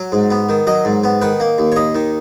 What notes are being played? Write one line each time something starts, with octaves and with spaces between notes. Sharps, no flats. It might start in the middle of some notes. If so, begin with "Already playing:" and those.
Already playing: F#3
G#2
B3
D#3
F#3 D#5
G#2
B3
D#3 B4
A#3
D#2
C#5
D#2 D#5
D#3